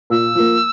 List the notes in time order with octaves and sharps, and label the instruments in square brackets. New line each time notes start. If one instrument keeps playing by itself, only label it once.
[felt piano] A#2 [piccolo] E6
[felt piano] F3 A#3